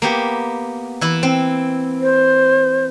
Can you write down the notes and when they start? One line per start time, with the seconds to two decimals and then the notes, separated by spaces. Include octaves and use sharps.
0.02 A#3 B3 G4
1.01 E3 E4
1.23 C4
2.01 C5